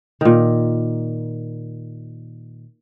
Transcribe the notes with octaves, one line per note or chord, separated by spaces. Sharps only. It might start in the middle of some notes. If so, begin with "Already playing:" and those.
A#2 D#3